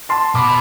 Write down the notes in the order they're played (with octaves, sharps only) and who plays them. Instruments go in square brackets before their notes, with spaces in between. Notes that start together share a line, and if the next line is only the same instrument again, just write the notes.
[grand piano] A5 C6
[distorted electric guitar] B2 [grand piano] B5 D6